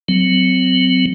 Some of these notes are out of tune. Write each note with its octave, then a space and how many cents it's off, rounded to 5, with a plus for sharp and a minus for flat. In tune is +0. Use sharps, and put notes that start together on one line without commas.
F#3 +0 C4 -30